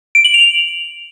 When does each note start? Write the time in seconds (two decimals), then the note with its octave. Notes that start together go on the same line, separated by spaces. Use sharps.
0.15 D7
0.25 F#7
0.34 F7